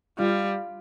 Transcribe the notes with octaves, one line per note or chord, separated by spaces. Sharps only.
G3 F4